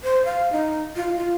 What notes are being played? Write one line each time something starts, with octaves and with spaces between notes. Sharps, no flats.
C5
F5
D#4
F4
F4